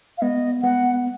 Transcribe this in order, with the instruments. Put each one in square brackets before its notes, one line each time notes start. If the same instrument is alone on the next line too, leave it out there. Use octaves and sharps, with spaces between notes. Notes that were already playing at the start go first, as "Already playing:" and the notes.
[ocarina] F5
[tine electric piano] G#3 B3 [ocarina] D#5
[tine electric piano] G#3 B3 [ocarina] F#5